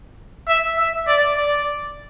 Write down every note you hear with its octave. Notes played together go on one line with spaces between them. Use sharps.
E5
E5
D5
D5